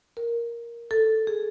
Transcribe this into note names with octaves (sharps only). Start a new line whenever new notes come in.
A#4
A4
G#4